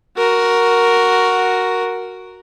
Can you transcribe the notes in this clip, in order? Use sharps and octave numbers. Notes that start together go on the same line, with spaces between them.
F#4 A#4